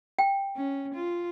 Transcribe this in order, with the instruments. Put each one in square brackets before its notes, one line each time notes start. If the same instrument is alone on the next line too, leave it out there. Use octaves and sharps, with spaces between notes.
[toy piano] G5
[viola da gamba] C#4
F4